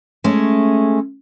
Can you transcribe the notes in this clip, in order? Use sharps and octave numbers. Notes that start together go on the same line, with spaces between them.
G#3 A3 C#4